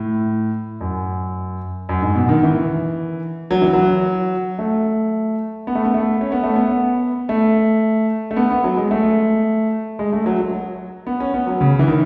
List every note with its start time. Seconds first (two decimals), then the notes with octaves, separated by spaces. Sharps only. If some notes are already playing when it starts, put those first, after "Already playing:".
Already playing: A2
0.81 F#2
1.89 F#2
2.02 G#2
2.15 B2
2.29 D#3
2.43 E3
3.51 F#3
3.61 E3
3.73 F#3
4.59 A3
5.67 B3
5.75 A3
5.85 B3
5.94 A3
6.21 C#4
6.32 B3
6.44 A3
6.55 B3
7.29 A3
8.31 A3
8.37 B3
8.51 B3
8.64 F#3
8.77 G#3
8.91 A3
9.99 G#3
10.12 A3
10.26 F#3
10.39 F#3
11.07 B3
11.20 C#4
11.34 B3
11.47 F#3
11.61 C#3
11.79 E3
11.88 D#3